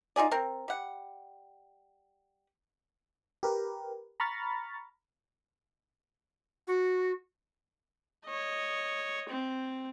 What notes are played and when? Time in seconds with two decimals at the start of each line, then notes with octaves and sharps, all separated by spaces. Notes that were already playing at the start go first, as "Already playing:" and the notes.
0.16 D#4 F4 G#4 D5
0.31 C4 A#4
0.68 G3 F#5
3.43 G4 A#4 B4
4.20 A#5 B5 C#6 F6 A6
6.67 F#4
8.26 C#5 D#5
9.29 C4